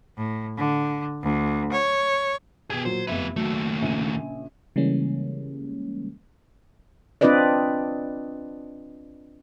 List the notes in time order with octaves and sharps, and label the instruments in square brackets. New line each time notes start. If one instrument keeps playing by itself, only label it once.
[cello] A2
D3
D2
C#5
[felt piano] B2 G#6 [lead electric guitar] G4 G#4
[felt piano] A#2 F#3 [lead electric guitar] C5
[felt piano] F1 E2 E5 [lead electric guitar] F3 B4
[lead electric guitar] D#2 A3 [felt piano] F#3
[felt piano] A#1 C#3 D#7
[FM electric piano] C#3 E3 G3 G#3 A#3 C#4
[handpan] C4 D4 F4 B4 D5 D#5